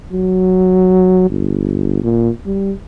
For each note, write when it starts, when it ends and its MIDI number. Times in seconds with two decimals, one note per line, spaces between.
0.12 1.30 54
1.30 2.01 31
2.03 2.30 46
2.46 2.72 55